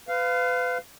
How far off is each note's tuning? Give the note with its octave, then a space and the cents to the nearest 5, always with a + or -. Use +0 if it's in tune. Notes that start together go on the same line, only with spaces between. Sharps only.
B4 +30 F5 -5